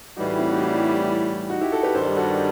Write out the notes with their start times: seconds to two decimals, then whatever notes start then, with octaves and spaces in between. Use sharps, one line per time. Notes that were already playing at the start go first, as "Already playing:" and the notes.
0.16 A2 E3 G3 D#4 F#4
0.28 D#4 F#4
0.39 C4 E4
0.50 D#4 F#4
0.61 D#4 F#4
1.50 D#4 F#4
1.61 E4 G4
1.72 F#4 A4
1.83 G4 B4
1.94 G2 D#3 G3 A4 C5
2.17 F#4 A4